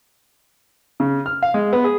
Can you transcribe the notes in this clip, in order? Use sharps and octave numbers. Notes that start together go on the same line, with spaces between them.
C#3
F6
F5
G#3
B3
G#4